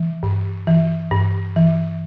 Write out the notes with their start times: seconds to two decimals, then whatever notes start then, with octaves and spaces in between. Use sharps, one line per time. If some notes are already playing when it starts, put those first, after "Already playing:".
Already playing: E3
0.23 G2
0.67 E3
1.11 G2
1.56 E3